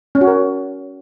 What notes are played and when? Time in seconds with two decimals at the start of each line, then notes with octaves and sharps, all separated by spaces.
0.15 C#4
0.21 F#4
0.27 A#4